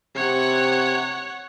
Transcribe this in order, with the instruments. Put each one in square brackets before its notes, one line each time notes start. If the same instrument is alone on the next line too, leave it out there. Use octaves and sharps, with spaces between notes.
[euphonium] C3 [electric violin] C#5 F#5